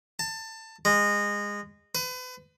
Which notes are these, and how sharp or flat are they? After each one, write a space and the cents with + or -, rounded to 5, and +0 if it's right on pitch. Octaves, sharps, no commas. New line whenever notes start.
A5 +20
G#3 -20
B4 +35